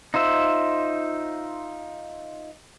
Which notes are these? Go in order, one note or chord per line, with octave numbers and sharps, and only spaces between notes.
D#4 F4 C5 E5